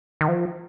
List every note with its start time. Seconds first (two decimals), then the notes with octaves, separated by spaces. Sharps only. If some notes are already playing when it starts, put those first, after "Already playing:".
0.21 D#3
0.28 F3